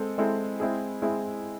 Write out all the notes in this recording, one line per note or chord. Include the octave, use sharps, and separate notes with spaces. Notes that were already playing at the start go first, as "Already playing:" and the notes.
Already playing: G#3 C4 A4
G#3 C4 E4 A4
G#3 C4 E4 G#4
G#3 C4 E4 G#4